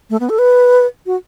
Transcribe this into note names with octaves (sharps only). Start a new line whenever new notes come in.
A3
B3
A4
B4
F#4